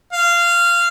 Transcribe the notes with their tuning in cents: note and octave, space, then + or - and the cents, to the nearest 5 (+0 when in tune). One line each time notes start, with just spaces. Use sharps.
F5 -15